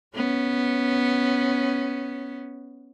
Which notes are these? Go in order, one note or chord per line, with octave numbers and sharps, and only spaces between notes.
B3 C#4